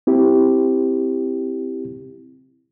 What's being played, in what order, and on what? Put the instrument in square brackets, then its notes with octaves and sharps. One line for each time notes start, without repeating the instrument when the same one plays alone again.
[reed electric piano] C4 E4 G4